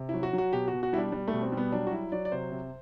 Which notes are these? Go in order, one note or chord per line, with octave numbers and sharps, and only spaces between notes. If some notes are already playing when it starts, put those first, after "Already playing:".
Already playing: C3
F#3 E4
F#4
F#3
F#4
B2 G4
F#4
B2
F#4
G3 D4 E4
G3
A3
B2
C4
G3
B3
F#3 D4
F#4
F#3 E4
F#3 D5
D5
C3 C5
C3